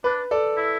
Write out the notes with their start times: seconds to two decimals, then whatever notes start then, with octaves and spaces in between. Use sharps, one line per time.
0.04 D4 B4
0.31 A4 D5
0.57 E4